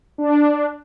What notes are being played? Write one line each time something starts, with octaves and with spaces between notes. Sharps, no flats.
D4